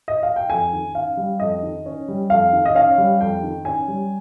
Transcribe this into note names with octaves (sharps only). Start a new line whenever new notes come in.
D#5
F5
G5
F2 G#5
D#3
C#4 F5
G3
F2 D#5
D#3
C#4
G3
F2 F5
D#3
D#5
C#4 F5
G3
F2 G5
D#3
C#4 G#5
G3